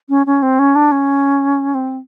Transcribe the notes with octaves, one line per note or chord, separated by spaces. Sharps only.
C#4
C#4
C4
C#4
D4
C#4
C4